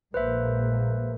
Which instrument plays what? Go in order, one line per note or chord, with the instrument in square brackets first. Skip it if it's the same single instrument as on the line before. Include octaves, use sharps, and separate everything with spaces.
[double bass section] A#1 G#3 A#3 [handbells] B4 C5 E5